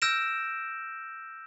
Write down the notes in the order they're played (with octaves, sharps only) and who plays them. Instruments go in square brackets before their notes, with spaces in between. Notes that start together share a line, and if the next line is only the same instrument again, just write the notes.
[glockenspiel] E6 F6 G6 A#6 D7 E7